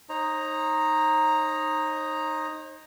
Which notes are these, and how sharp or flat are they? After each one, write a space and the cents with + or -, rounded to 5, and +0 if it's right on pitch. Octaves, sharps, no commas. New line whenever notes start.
D#4 +0 C5 +45 A#5 +0